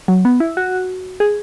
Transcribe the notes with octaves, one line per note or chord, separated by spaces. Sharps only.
F#3
B3
E4
F#4
G#4